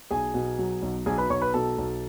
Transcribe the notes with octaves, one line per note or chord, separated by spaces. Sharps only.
B1 G#4 G#5
B2
F#3
B1
B1 G#4 G#5
B4 B5
B1 C#5 C#6
B4 B5
B2 A4 A5
B1